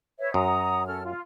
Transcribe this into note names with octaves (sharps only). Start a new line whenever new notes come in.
B4 C#5 E5
F#2 F#5 A#5 D#6
C#4 A4 F6
F4